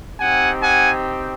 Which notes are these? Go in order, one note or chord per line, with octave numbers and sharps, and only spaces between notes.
C4 D#4 G4 F#5 G#5
F#5 G#5